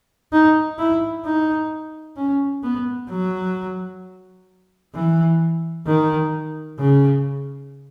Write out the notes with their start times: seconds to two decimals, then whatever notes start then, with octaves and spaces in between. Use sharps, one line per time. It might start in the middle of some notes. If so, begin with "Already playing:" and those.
0.32 D#4
0.78 E4
1.25 D#4
2.17 C#4
2.63 B3
3.10 F#3
4.94 E3
5.87 D#3
6.79 C#3